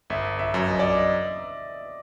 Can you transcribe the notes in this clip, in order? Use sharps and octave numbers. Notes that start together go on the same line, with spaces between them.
G1 E5
E5
F#2
D#5
D5
D#5